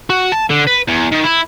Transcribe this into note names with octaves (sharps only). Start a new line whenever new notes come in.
F#4
A5
D3
B4
E2
D#3
E4